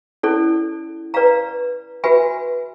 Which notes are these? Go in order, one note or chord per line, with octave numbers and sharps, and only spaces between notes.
C#4 E4 A4 D5
B4 D5 F5 A#5
F#4 B4 E5 G#5 B5